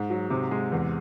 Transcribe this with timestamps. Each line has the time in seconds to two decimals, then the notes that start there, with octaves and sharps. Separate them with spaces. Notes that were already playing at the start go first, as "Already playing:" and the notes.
Already playing: G#2
0.10 F#3
0.30 C3
0.51 G#3
0.72 E2